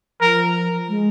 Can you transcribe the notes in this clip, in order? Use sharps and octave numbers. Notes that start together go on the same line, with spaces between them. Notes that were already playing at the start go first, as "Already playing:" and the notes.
F3 A#4
G#3